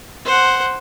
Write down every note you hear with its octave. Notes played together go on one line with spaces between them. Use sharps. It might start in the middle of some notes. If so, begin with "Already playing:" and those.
C5 F#5